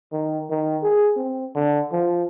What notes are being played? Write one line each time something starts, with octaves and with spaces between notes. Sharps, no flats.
D#3
D#3
G#4
C4
D3
F3